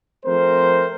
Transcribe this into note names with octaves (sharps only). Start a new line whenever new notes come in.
F3 A3 C4 A#4 C5